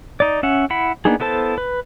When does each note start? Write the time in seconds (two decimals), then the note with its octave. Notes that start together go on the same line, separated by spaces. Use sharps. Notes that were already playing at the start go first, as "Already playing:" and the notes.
0.20 D#4 D5
0.43 C#4 E5 F#5
0.70 E4 F#5 B5
1.05 A#3 B3 D4 D#4 G#4
1.20 B3 E4 A4 C5 A5
1.58 B4